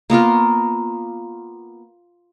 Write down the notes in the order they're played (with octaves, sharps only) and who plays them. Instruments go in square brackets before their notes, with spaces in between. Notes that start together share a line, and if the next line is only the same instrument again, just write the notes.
[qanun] A#3 B3 F4 A#4